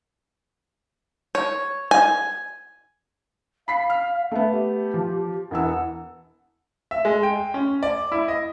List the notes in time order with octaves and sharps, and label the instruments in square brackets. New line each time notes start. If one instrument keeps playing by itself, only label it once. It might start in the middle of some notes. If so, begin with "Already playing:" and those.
[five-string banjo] C#5
G#5
[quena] F5 [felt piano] B5 B6 C7
[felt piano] F6
[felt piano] A3 B3 [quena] E5
[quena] G4
[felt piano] F3
[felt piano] E1 E3 E6 [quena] F#5
[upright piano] E5
G#3
G5
C#4
D5
E4
D#5